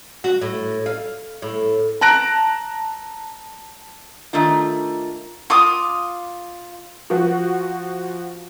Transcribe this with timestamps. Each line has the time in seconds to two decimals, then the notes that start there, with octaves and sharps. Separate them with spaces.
0.24 F#4
0.41 A2
0.86 F5
1.42 A2
2.01 A5 A#5 F#6 A#6 D7
4.33 D#3 A3 D4 F4
5.50 F4 D6 D#6
7.10 F3 F#4